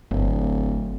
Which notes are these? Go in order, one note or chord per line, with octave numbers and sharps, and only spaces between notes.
D1 G1